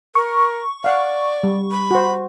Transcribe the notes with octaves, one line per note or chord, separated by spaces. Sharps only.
A#4 C#6
D5 F5 F#5
G3
B5
F#4 C5